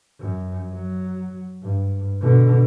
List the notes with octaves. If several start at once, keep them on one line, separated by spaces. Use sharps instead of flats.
F#2
F#3
G2
B2 D3